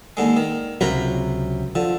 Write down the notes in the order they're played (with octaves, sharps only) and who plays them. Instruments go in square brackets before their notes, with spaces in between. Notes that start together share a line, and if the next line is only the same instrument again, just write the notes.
[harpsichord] D#2 D3 G#3
D#3
[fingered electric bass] C#2 C3 F#3 [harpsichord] F4 A#4 B5
[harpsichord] D3 [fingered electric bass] F3